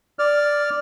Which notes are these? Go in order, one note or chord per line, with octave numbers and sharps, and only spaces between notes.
D5 F6